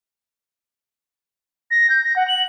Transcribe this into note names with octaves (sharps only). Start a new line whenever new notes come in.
A#6
G6
A#6
F#5
F#7